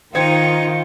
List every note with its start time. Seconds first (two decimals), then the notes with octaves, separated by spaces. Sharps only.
0.15 D#3 D#4 F4 C5 G5 G#6 C#7